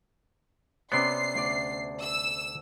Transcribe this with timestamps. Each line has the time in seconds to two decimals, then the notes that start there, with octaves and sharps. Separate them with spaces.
0.92 C3 B3 C#4 C5 D5 C7
1.35 D2 D5
2.02 E6